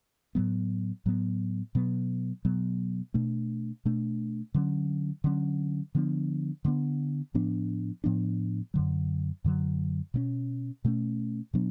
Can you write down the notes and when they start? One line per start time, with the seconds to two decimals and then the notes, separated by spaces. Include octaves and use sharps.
0.35 A2 F#3 B3
1.06 A2 F#3 B3
1.75 B2 F#3 B3
2.45 B2 F#3 B3
3.14 B2 A3 D4
3.85 B2 A3 D4
4.54 D3 F#3 C#4
5.24 D3 F#3 C#4
5.95 D3 F3 B3 D4
6.65 D3 F3 B3 D4
7.34 A2 F3 B3 D4
8.04 A2 F3 B3 D4
8.74 F#2 D3 F#3
9.44 F#2 D3 F#3
10.14 B2 A3 C#4
10.85 B2 A3 C#4
11.54 B2 F#3 B3 D4